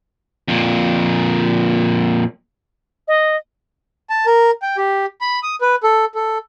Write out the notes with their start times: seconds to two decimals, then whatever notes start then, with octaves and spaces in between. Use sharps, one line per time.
0.48 F2 A#2
3.08 D#5
4.10 A5
4.26 A#4
4.62 G5
4.77 G4
5.21 B5
5.43 D#6
5.61 B4
5.84 A4
6.15 A4